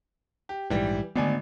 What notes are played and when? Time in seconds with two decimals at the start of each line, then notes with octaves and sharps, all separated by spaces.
0.49 G4
0.70 A#1 G#2 E3 G3 G5
1.16 G#1 D3 A3 B3 D4 G#5